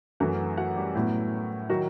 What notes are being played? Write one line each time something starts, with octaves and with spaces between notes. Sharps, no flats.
F#2 E3 A3 F#4 F#5
F#4 F#5
G3 G4
A2 F#3 B3 E4
D#3 F#3 F#4